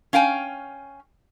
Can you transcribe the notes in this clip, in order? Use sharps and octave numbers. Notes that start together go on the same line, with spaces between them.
C#4 F5 G5 G#5